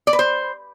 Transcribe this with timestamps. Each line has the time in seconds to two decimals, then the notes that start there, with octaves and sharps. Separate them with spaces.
0.07 D5
0.13 B4
0.19 C5